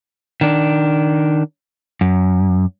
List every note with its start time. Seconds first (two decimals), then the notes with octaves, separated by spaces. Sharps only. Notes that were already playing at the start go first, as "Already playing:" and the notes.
0.41 D#3 D4
2.01 F#2